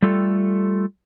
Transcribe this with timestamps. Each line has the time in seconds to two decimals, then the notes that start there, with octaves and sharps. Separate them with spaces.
0.02 G3 A3 F4 A4